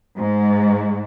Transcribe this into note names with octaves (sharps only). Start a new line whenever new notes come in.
G#2